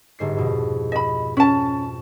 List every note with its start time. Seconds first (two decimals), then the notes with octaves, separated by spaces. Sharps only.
0.19 G1 G#2 C7
0.37 F2 B2
0.92 D#5 B5
1.37 C#4 A5